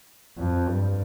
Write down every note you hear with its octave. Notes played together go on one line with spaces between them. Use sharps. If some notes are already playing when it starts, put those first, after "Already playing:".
F2
G2